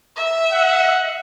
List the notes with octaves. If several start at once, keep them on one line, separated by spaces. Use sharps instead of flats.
E5
F#5